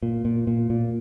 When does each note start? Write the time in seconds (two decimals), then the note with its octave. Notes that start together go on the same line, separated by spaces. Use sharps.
0.03 A#2
0.25 A#2
0.47 A#2
0.70 A#2